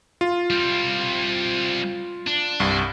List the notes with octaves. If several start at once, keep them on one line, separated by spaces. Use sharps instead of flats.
F4
G3 C4
D4
C2 G2